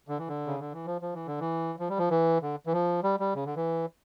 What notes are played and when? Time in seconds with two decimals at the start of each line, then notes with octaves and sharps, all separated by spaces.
0.08 D3
0.19 E3
0.28 D3
0.47 C#3
0.60 D3
0.73 E3
0.86 F3
1.01 F3
1.14 E3
1.27 D3
1.40 E3
1.79 F3
1.89 G3
1.98 F3
2.10 E3
2.42 D3
2.66 E3
2.72 F3
3.03 G3
3.20 G3
3.35 C#3
3.45 D3
3.56 E3